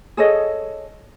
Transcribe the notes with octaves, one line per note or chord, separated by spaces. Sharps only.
G#4 A4 C#5 D#5